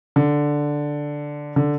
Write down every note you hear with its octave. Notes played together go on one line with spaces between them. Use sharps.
D3
D3